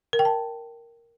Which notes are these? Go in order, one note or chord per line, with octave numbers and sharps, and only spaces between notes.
A#4
G5
A5